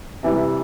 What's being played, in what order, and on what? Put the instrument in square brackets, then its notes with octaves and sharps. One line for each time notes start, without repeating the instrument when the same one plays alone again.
[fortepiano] C3 E3 G3